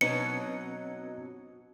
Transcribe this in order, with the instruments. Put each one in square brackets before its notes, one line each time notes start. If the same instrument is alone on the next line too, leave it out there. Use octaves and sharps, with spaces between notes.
[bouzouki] B2 F#3 D#4 [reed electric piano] C4 D4 B4 [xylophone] C#7